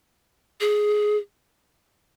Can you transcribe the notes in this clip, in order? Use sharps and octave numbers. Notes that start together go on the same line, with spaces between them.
G#4